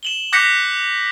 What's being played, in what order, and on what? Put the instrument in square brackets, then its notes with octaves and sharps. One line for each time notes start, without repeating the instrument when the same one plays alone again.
[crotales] E7 F#7 G7
D6 F#6 G6 A#6 B6 C#7